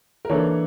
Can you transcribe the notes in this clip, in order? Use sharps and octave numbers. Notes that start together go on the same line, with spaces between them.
A#4
E3 A#3 D4 A4 C#5